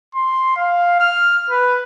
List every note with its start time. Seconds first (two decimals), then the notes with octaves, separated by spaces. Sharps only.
0.15 C6
0.56 F5
1.00 F6
1.50 B4